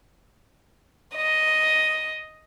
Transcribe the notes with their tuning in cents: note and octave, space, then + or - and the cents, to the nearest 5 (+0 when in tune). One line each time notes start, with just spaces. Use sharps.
D#5 +5